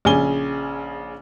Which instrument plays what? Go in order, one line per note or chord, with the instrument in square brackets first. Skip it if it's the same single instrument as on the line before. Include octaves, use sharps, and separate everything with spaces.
[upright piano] A#1 C#3 G#5 G7